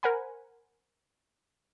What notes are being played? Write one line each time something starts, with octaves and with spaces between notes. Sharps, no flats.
A#4 C5 F#5 G#5 B5